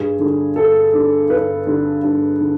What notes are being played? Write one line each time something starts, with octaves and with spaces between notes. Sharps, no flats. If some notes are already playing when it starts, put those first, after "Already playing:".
Already playing: G2 G#4
D3 G3
G2 A4
D3 G3
G2 B4
D3 G3
G2
D3